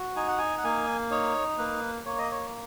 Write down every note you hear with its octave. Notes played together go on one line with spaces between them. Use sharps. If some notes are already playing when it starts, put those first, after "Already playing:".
Already playing: F#4
D#4 G#5
F#5
G#5
F#5
A#3 G#5
D#4 C#5
A#3 B4
A#3 C#5
D#5
C#5